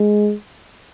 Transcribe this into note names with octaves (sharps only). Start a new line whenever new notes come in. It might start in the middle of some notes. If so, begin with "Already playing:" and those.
Already playing: G#3